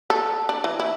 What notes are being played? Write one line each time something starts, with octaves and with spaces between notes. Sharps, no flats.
A4
D4
E3
E4